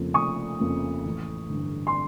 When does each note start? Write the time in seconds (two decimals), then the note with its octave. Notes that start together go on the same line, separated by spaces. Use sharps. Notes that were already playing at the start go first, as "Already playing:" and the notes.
Already playing: F1 F2 C#3 F3 A#3
0.14 F1 C#6 D#6
0.60 F2 C#3 F3 A#3
1.05 A1
1.50 G2 D3
1.87 C6